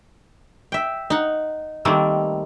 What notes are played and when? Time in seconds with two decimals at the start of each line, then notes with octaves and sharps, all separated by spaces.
0.72 E5 G5
1.10 D#4 F#5
1.85 D#3 G3 A3 A#3 C4